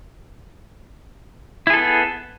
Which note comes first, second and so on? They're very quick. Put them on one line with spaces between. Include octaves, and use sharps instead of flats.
E4 G#4 A4 B3